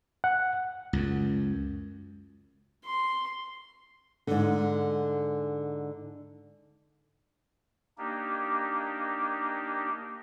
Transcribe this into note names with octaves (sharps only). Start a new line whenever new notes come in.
F#5
C#2 F#2
C6
G#2 D3
A#3 D4 D#4 G4